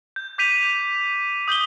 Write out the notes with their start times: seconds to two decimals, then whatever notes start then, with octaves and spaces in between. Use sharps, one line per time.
0.16 G6
0.38 D6 G6 B6 D#7 F7
1.48 D#6 G6 F#7 G7